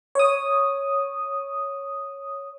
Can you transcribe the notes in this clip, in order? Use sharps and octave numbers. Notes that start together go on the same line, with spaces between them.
C#5 D#6